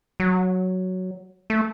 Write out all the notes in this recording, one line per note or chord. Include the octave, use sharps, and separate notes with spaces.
F#3
A3